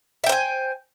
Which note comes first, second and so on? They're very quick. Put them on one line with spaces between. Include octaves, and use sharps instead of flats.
E5 G5 C5 G#5